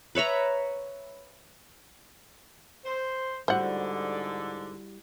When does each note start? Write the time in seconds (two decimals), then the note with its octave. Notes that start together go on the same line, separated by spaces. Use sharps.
0.15 B4 C#5 E5 A#5
2.85 C5
3.48 G#2 D3 G3 E4 F#4 C5 F#5